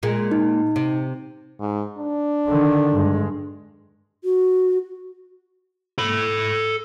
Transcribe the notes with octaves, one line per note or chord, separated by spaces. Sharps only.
A#2 G#3
D#4
C3
G#2
D4
D3 D#3
G2 G#3
F#4
A4 B5